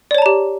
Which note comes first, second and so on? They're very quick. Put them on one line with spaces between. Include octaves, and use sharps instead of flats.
D5 C#5 A5 A#5 G4